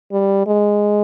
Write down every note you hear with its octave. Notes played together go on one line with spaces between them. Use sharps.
G3
G#3